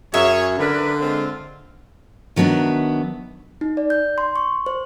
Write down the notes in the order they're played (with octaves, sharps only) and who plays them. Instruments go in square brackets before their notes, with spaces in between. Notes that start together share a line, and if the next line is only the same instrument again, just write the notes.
[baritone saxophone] F#2 [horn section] G#4 C#5 [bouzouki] E5
[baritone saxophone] D3 [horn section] A#4 B4 D5
[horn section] G#3 C4 F4
[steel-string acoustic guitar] D#3 F#3 B3 D4 E5
[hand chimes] D#4
D5
G6
C6
C#6
C5